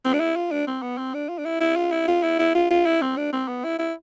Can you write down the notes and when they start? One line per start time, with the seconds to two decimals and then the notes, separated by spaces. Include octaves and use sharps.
0.05 C4
0.14 D4
0.20 E4
0.36 F4
0.51 D4
0.67 C4
0.82 B3
0.98 C4
1.14 D4
1.29 F4
1.38 D4
1.45 E4
1.61 E4
1.76 F4
1.92 E4
2.08 F4
2.23 E4
2.39 E4
2.55 F4
2.71 F4
2.86 E4
3.02 C4
3.17 D4
3.33 C4
3.48 B3
3.64 E4
3.79 E4